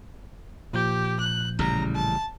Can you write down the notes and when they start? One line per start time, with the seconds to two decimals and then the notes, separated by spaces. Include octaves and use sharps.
0.73 A#2 F3 G4 G6
1.20 F#6
1.59 A1 C#3 G3 A#5
1.95 A5